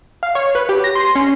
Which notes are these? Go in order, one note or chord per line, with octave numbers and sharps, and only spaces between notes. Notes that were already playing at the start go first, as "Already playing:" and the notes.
F5
C#5
B4
G4
A#6
C6
C#4